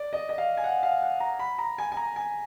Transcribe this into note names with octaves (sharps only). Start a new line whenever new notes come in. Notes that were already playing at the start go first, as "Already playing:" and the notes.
Already playing: D5
D#5
D#5
F5
G#5
F#5
F5
F#5
A#5
B5
A#5
G#5
G#5
A#5
G#5